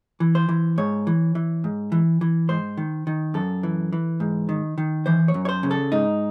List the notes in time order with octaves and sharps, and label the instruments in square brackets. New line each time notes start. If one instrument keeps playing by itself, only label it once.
[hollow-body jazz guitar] E3
C5
E3
G#2 C#5
E3
E3
G#2
E3
E3
G#2 C5
D#3
D#3
F#2 A4
E3
E3
G#2
D#3
D#3
E3 C5
C#5
F#2
C#5
C5
C#3
A4
G#2 D#4